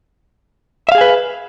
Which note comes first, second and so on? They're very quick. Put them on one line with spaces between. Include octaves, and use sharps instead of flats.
E5 F5 G#4 G#5 B4